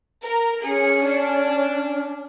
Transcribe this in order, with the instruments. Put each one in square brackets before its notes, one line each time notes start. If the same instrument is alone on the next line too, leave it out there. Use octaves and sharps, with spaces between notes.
[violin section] A#4
[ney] C#4 [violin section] G#4 C#7
[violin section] D4